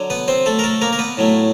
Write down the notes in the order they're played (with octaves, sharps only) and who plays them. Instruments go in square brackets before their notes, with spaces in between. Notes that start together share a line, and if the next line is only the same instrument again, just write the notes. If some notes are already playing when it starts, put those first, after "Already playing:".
Already playing: [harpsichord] D3 F#3
B3 B4
C4 C5
A3 A4
A#4
A3 A4
A#3 A#4
A#4
B3 B4
A2 F#3 A3